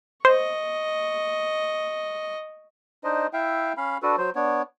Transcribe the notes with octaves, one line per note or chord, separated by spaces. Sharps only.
C5 D#5 C#6
D4 D#4 C5 D#5
E4 E5 F5 G5
C#4 F5 B5
D4 F#4 A4 B4
F#3 C5
B3 D4 C#5